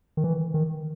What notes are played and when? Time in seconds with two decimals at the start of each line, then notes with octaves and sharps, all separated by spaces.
0.17 D#3
0.24 E3
0.54 D#3